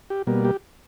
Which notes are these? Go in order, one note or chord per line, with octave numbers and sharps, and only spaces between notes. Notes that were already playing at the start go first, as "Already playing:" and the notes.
G4
B2 G3 A#3
G4